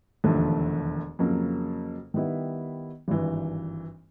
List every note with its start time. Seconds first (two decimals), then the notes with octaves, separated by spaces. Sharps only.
0.24 E1 D#2 D3 F3 A3
1.19 F2 C#3 F#3 A#3
2.14 D#3 G3 B3 E4
3.08 G#1 G2 E3